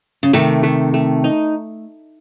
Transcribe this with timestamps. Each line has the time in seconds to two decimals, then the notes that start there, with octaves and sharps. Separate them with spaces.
0.23 C#3
0.33 C3 D#3 A3
0.63 A3
0.94 A3
1.24 D#4